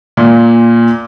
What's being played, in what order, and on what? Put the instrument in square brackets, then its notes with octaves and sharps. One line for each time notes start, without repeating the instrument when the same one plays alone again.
[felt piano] A#2